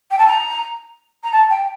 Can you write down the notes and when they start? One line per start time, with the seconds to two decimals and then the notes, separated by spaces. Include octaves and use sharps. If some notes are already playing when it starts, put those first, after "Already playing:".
0.11 G5
0.19 A5
0.28 A#5
1.24 A#5
1.33 A5
1.50 G5